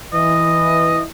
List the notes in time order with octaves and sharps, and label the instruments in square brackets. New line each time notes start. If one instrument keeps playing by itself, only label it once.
[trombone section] E3 [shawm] D#5